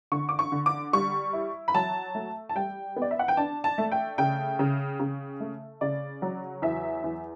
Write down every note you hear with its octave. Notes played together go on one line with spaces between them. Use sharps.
D3 C#6
D6
C#6
D3
D6
G3 C#6
E4
B5
F#3 A5
A3
A5
G3 G5
B3
D5
E5
F#5
G5
D4 A5
A5
A3
G5
C#3 G5
C#3
C#3
A3
C#3 D5
F#3
E2 E5
E2